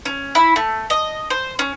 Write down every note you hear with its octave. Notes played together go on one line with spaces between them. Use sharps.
C#4
E4
A3
D#5
C5
C#4